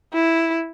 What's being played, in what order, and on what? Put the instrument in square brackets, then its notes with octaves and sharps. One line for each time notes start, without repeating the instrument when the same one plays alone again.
[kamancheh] E4